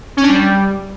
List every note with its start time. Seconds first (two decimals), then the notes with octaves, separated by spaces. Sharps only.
0.17 C#4
0.23 D4
0.29 G3